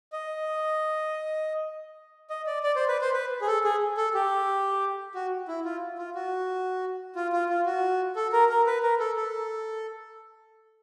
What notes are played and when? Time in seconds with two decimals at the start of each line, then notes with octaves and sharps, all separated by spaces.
0.12 D#5
2.30 D#5
2.47 D5
2.63 D5
2.76 C5
2.88 B4
3.01 C5
3.13 B4
3.41 G#4
3.47 A4
3.64 G#4
3.97 A4
4.14 G4
5.15 F#4
5.48 E4
5.65 F4
5.98 F4
6.15 F#4
7.16 F4
7.32 F4
7.49 F4
7.66 F#4
8.16 A4
8.32 A#4
8.50 A#4
8.67 B4
8.83 A#4
9.00 A4
9.16 A4